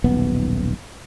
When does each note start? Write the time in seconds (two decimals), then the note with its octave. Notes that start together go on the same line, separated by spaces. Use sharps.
0.04 D#1 B1 B3